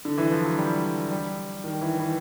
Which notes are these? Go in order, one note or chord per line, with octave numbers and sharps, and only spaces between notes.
D3
E3
F3
F#3
G3
G3
D#3
E3
E3